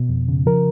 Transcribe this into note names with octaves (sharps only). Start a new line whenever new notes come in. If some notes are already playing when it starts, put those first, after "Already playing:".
Already playing: B2
F2
C#3
F3 A#4